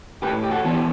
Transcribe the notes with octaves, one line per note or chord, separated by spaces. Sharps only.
A2 G4 B4
G4
F#4 A4
E3 B3 D4
G4